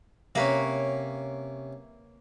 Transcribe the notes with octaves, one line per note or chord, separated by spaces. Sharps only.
C3 A#3 C#4 B4 C#5